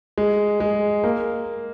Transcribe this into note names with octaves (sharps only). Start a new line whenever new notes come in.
G#3
G#3
A#3